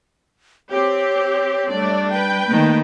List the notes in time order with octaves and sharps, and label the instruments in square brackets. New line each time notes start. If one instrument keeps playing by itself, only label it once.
[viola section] C4 G4 [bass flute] C#5
[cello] G3 D4 [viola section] A3 D5
[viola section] B4 G5
[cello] D#3 A3 [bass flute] A#3